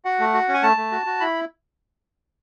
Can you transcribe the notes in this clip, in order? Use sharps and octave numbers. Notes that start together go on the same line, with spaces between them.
F#4 F#5
A3
F#4
C#4
G#5
A3 A5
A3
F#4
F#4
E4 B5